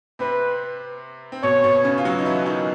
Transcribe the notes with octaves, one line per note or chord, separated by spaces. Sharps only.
C3 C4 B4
C4
B2 B3 C#5
B2 B3
C#3 C#4
F4
F#3 F#4
D#4
E3 E4
D#3 D#4